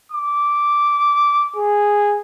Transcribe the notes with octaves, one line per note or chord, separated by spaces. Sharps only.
D6
G#4